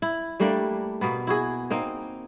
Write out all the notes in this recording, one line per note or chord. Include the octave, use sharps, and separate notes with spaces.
E4
G3 A3 A#3 D4
B2 A#3 B3
E4 F#4 G#4
A#3 C4 D#4